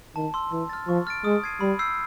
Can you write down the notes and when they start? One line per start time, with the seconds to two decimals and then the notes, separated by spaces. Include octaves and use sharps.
0.16 D#3 A5
0.34 C6 E6
0.52 E3 C6
0.69 F6 A6
0.88 F3 C#6
1.07 F6 A6 D7
1.24 G#3 D#6
1.44 G#6 C7 D#7
1.61 G3 B5
1.79 E6 G6 C7